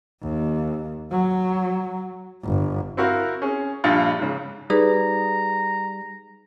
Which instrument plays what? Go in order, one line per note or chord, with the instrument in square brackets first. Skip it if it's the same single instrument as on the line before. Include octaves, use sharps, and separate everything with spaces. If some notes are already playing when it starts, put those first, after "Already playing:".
[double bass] D#2
F#3
G1
[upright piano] C4 E4 F#4 A#4 F5
C#4 G#4
A#1 G2 F4 A6
G#2 C#3
[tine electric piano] G3 [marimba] D#4 G#4 B4 [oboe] A#5